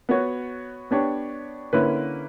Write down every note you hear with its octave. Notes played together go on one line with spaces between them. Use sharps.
B3 F#4 C#5
B3 D4 G4 C#5
D3 A#3 C#4 E4 B4